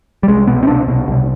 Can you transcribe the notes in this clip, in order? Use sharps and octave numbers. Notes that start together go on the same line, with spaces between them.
G3
C2 G#3
B2 B3
C4
C2 D4
B2
C2